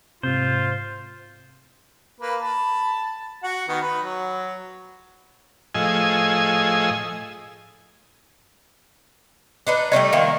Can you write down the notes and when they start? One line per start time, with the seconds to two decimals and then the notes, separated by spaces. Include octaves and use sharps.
0.23 G#2 C3 F4 C5
2.20 A#3 B4
2.42 A5 B5
3.43 F#4 F#5
3.68 D#3 B3 F#4
3.81 B4
4.02 F#3
5.75 A2 F3 G#4 D#5 G#5 E6
9.67 D4 D#4 B4
9.92 G3 A3 C#4 D#4
10.13 D#3 F3 A#3